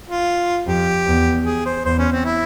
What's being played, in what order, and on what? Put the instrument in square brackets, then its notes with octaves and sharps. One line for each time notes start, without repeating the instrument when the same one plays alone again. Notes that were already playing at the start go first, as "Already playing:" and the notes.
[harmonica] F4
[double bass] F2 [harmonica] G4
[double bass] E2
[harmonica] G#4
C5
[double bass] E2 [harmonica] C5
[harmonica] C#4
C4
E4